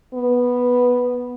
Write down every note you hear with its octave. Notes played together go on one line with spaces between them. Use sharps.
B3